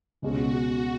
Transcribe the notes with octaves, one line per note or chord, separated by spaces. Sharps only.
C#2 B2 G#3 C#4 F#4